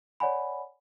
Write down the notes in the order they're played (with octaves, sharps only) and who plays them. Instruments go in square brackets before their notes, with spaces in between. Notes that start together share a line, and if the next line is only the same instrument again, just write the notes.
[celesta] C#5 D5 F#5 G#5 B5